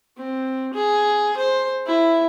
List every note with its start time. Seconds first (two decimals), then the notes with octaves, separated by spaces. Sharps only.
0.17 C4
0.74 G#4
1.37 C5
1.87 E4